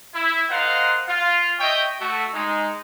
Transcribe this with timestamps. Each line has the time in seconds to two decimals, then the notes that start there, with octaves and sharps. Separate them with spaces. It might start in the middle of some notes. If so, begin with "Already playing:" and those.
0.14 E4
0.50 F4 A#4 C5 D#5 F5 F#5
1.07 F4 F5
1.59 C#5 D#5 E5 G5
2.00 A3 F#4 A4
2.33 G#3 D#4